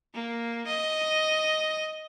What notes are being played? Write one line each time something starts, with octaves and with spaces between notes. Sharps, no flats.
A#3
D#5